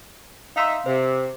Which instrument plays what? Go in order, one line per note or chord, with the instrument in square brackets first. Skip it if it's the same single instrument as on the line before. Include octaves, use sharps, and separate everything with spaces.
[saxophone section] D#4 E5 [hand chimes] F5 C6
[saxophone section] C3 [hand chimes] C5